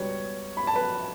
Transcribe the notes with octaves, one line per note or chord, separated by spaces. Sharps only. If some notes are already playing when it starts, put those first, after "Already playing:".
Already playing: C#2 B2 G3 B3 C#5 C#6
B5
A5
B4 B5